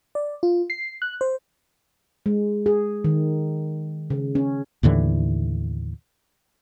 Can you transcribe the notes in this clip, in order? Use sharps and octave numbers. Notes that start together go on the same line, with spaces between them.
D5
F4
C7
F#6
C5
G#3
G#4
D#3
C#3
C#4
D#2 A2 D3 E3